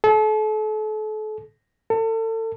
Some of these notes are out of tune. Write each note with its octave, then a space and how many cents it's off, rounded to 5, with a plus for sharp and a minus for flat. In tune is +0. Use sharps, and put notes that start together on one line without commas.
A4 -35
A4 +35